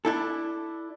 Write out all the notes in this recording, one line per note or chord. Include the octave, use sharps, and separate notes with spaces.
D4 E4 A4